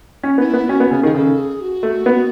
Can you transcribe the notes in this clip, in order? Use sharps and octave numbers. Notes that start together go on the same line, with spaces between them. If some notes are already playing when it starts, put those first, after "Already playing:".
C#4
B3
D#4
E4
B3
C#4 F#4
B3
C#3 G#4
D#3 G#4
C#3 A4
G#4
F#4
A3
B3